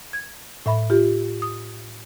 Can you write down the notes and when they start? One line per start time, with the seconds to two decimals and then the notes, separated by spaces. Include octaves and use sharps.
0.13 G#6
0.66 A2 E5 B5
0.90 F4 G4
1.42 D#6